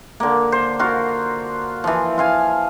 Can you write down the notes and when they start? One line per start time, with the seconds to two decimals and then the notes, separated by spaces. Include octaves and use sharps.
0.20 D3 A#3
0.52 C5
0.79 F4 F#4 A#4
1.84 E3 F3
2.18 F4 F5 G#5